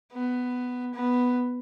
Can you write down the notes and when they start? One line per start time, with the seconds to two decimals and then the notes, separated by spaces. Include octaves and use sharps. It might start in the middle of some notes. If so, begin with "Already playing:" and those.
0.13 B3
0.94 B3